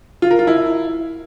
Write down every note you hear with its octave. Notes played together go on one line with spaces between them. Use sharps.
F4
A#4
F4
E4